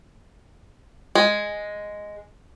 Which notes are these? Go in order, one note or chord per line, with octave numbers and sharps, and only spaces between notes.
G#3